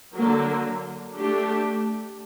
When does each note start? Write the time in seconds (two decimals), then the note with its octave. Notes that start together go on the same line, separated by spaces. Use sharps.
0.14 D3 F#3 A#3
1.17 A3 D4 G4